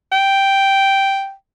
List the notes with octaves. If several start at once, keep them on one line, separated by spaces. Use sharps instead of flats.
G5